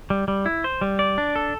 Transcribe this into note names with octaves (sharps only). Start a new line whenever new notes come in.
G3
G3
E4
C5
G3
D5
D4
A4